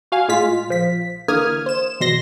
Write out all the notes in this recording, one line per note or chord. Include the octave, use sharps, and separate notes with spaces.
F#4 F5 G#5
A2 G#3 F4 B6
A#1 F3 B6
D3 E3 A#3 D#6 F6 G#6
C5 E7
G1 E2 B2 C6 A#6